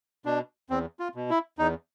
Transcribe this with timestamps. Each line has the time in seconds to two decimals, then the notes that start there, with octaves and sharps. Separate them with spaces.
0.26 B2 D4
0.70 E2 C4
0.99 F4
1.15 B2
1.30 E4
1.59 E2 D#4